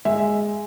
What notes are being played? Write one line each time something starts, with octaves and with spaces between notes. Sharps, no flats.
G#3 E5